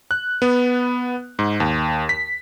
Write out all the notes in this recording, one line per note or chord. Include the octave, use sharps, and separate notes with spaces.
F#6
B3
G#2
D#2
B6